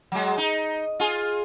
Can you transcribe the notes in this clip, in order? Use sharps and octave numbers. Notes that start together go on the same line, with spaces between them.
F#3 G#3
D#4
F4 G#4